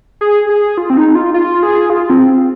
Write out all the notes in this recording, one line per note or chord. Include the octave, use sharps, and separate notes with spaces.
G#4
G#4
F4
C4
D#4
F4
F4
G#4
F4
C4